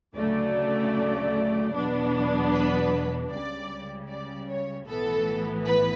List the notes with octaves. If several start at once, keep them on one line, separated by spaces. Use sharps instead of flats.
D2 C#3 F#3 A3 D5
E2 B2 F#3 B3 D4
B4
C#2 C#3 G3 D5
D5
C#5
B1 A2 E3 B3 A4
B4